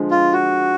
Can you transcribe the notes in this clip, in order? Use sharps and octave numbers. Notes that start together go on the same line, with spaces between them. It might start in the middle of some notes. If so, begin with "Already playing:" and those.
Already playing: D3 F3 G#3
F4
F#4